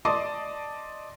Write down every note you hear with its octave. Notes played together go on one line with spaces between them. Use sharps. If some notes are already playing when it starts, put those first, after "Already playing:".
D5 D#5 A5 C6 D6 D#6